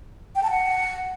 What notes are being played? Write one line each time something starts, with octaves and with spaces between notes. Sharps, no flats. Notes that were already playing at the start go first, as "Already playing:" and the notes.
G5
A5
F#5